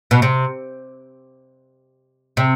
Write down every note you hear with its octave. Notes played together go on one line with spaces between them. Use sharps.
B2
C3
C3